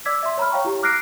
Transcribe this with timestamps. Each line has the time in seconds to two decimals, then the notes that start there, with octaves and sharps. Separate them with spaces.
0.06 D5 D6 E6 G#6 B6
0.23 E5 C6
0.38 C#5 A#5 B5 F6
0.52 C#5 F5 G5 C#6
0.65 E4 G4 A#5
0.83 D6 F6 F#6 A#6 C7 D7